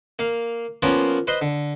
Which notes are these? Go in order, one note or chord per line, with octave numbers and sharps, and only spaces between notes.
A#3 F5
F3 A#3 B3 C#4 F4 A#4
B4 C5 D#5 C6
D3